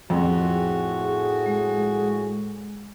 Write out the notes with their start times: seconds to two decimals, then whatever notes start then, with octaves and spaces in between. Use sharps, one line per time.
0.10 F2 A2 F#4 G#4
1.46 G#3